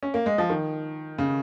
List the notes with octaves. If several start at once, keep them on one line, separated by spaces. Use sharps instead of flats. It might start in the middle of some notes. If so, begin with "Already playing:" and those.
C#4
A#3
G#3
F3
D#3
C#3